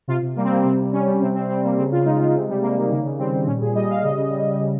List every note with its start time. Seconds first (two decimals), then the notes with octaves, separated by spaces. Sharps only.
0.08 C3 F4
0.22 C3
0.36 G3 A#3
0.44 C4
0.50 G3 A#3
0.64 C3 C4
0.79 C3
0.92 G3 C#4
1.06 G3
1.22 C3 C4
1.35 C3 C4
1.49 G3 C4
1.63 G3 A#3
1.78 C#3 C4
1.92 C#3 F4
2.05 G#3 D#4
2.20 G#3 F4
2.34 C3 C4
2.49 G3
2.62 C3 A#3
2.77 D#3
2.90 C#3 A#3
3.05 C#3
3.19 G3 C4
3.33 G3
3.47 A#2 C#4
3.61 A#2 G#4
3.75 G3 D#5
3.89 G3 F5
4.03 C#3 D#5
4.17 C#3
4.32 G3
4.46 G3
4.60 C#3